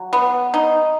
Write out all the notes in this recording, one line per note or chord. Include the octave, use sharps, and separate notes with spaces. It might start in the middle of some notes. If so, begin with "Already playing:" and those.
Already playing: F#3
B3
D#4